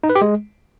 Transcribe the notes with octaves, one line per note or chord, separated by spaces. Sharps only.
D#4
B4
G4
G#3